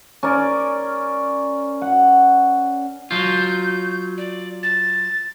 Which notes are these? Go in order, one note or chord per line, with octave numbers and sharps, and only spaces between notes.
C#4 A#4 D5
F#5
F#3 F4 G6
D5
A6